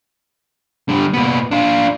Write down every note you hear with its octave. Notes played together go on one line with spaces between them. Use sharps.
D3 G3
A#2 B3
D4 F4